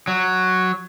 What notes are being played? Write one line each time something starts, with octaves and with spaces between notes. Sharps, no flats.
F#3